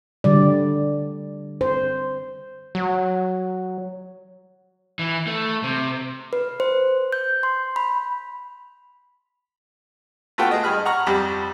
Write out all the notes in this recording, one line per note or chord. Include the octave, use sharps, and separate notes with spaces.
D3 G3 D5
C5
F#3
E3
A3
C3
B4
C5
G6
C6
B5
A3 B3 F4 F#4 G5 A5
G#4 D#5
G2 G#4 B5 F6
F#5 A#5 C#6 F6
F2 G3 G4 B5